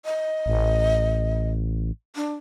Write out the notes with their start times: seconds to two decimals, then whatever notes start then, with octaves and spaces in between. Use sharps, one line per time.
0.05 D#5
0.46 A1
2.16 D4